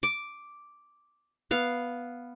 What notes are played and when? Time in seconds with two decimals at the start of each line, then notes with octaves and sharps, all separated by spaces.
0.03 D6
1.51 B3 F5